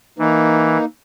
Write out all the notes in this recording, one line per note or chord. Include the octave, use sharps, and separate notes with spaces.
E3 A#3 D#4